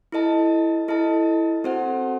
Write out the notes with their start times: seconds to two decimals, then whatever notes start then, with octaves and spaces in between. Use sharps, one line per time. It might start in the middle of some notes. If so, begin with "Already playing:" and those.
0.12 E4 A4 D#5 A5
0.88 E4 A4 D#5 A5
1.64 C4 F#4 A4 C5 F#5